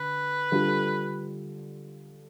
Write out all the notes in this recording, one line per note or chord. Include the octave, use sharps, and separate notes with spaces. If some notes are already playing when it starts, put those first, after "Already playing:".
Already playing: D3 B4
D3 G3 D4 F4 A4